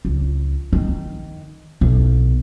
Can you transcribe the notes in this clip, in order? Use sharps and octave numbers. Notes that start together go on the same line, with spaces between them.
C#2
D#3
B1